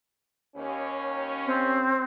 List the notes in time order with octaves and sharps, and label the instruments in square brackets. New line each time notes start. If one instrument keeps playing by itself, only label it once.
[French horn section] D#2 C#4
[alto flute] C4